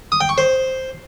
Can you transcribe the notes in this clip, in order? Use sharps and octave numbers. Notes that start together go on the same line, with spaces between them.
D#6
G5
C#6
C5